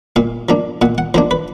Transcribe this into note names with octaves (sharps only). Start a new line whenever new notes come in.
A#2 F5
F3 A#3 D4
A#2 F#5
F#5
F3 A#3 D4 C5
B4